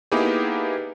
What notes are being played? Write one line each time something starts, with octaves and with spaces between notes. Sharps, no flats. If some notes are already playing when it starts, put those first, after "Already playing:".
A#3 B3 D#4 E4 G4 G#4